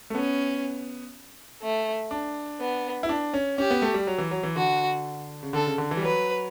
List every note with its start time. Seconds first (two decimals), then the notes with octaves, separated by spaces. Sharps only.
0.10 A3
0.15 B3 C#4
1.62 A3
2.11 D4
2.60 B3
3.03 E4
3.09 D4
3.34 C#4
3.58 C#4 G4
3.71 B3
3.82 A3
3.94 G3
4.07 F#3
4.18 E3
4.31 F#3
4.43 E3
4.56 D3 F#4
5.43 C#3
5.53 D3 A4
5.67 C#3
5.78 D3
5.91 E3
5.97 G3
6.03 F#3 B4